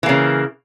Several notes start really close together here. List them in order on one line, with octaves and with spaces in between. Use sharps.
E3 A#3 C#3